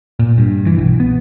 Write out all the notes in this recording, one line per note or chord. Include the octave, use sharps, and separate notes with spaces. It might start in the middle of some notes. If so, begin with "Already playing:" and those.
A#2
G2
E3
B1
B3